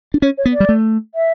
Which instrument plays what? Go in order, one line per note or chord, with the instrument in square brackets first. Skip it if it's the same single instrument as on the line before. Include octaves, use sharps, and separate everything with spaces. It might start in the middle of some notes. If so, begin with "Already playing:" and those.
[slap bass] D4
[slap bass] C#4 [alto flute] C#5
[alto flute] C#5
[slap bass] B3
[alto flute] D5
[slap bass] G3
A3
[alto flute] E5